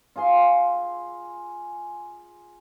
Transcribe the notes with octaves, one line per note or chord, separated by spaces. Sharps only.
F4 G#4 G#5 C6